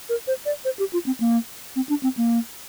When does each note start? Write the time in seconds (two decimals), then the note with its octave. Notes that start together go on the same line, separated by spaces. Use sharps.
0.09 A#4
0.28 C5
0.46 D5
0.65 C5
0.79 G4
0.93 F4
1.06 C4
1.20 A#3
1.76 C4
1.89 D4
2.03 C4
2.17 A#3